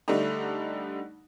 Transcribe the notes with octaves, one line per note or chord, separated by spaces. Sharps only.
D3 G3 A3 D4 D#4